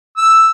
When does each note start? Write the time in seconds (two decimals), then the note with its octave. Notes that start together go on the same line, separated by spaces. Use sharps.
0.17 E6